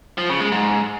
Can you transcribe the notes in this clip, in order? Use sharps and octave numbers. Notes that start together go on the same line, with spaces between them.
F3
C#3
G#3
G#2